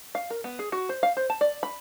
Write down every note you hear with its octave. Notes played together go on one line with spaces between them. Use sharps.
F5
A#4
B3
G#4
F#4
C5
F5
C5
A5
D5
B5